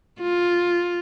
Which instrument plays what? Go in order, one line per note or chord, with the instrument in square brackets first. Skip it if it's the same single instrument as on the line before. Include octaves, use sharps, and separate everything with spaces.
[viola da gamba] F4